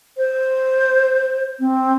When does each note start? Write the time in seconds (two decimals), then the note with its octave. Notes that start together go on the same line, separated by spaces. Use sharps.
0.17 C5
1.59 C4